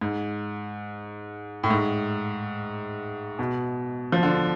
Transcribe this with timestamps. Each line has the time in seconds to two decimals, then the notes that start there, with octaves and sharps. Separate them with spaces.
0.01 G#2
1.64 A2
1.70 G#2
3.39 B2
4.12 F3
4.23 D3